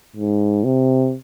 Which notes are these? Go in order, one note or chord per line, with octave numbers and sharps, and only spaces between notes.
G#2
C3